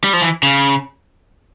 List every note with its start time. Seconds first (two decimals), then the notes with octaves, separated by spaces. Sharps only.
0.04 G3
0.13 F3
0.22 E3
0.43 C#3